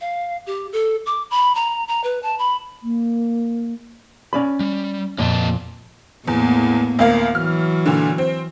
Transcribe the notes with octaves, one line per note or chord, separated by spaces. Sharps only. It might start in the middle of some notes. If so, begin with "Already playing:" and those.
F5
G4
A4
D6
B5
A#5
A#5
B4
A5
B5
A#3
C#4 D5 B5
G3
F2 A#2 A#3 D#5 A5
E2 A2 A#3 B3
D2 A#3 F5
E3 F#3 F6
A#2 D3
C4